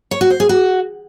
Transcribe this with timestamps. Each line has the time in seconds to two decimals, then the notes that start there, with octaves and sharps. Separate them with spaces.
0.11 C#5
0.21 F#4
0.30 C5
0.40 G#4
0.49 F#4